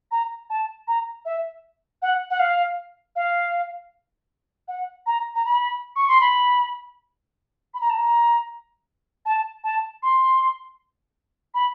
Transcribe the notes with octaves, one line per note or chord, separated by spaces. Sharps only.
A#5
A5
A#5
E5
F#5
F#5
F5
F5
F#5
A#5
A#5
B5
C#6
C6
B5
B5
A#5
A5
A#5
A5
A5
C6
B5